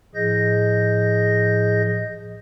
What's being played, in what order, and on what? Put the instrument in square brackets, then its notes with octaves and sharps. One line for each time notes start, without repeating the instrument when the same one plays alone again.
[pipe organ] A2 F3 G#4 D#5 G6 A#6